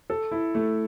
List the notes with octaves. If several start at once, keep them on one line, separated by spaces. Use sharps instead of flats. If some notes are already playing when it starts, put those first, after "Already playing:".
A4
E4
A3